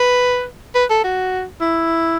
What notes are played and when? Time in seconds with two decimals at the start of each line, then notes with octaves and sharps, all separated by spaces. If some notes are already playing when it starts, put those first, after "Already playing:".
Already playing: B4
0.75 B4
0.90 A4
1.04 F#4
1.61 E4